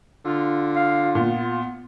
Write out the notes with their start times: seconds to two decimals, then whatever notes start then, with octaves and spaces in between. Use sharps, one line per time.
0.25 D3 F4
0.76 F5
1.15 A#2 B3